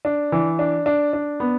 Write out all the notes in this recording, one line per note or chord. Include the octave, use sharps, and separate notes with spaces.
D4
E3
D4
D4
D4
B3